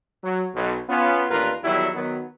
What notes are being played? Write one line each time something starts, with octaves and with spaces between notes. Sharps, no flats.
F#3
B1
B3 C#4 F4
A1 D#2 D4 F4 A#4 B4
E2 D#3 F#3 G3 E4
D#3 F#3 B3